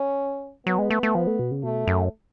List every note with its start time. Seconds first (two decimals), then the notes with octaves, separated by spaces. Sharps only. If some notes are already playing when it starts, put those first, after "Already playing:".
Already playing: C#4
0.67 F#3 B3
0.78 G#3
0.90 A3
1.03 A3
1.15 F3
1.27 A3
1.39 B2
1.51 C#3
1.63 B2 A3
1.87 F#2